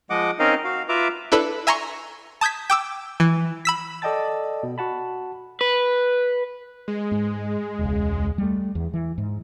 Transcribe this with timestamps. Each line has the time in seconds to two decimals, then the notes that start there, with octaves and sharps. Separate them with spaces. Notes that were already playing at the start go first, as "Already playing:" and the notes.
0.10 F3 G#3 D#5 F#5 D6
0.39 C4 C#4 D#4 A#4 D#5 F5
0.64 F#4 F5
0.89 F4 B4 E5 A#5 D6
1.32 D4 E4 A4 B4
1.67 E5 G#5 A#5 C6 C#6
2.41 A5 D#6 G6 G#6 B6
2.70 G5 D6 E6
3.20 E3
3.65 B5 E6 B6
4.02 A4 D5 D#5 G5 A5 A6
4.63 B2
4.78 F#4 F#5 A5 B5
5.61 B4
6.88 G#3
7.11 G#2
7.79 E1 C#2
8.38 G3 A3
8.75 E2
8.94 E3
9.18 G#2